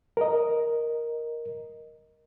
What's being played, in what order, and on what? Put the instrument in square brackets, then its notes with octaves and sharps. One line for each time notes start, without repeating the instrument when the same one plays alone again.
[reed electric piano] A#4 D#5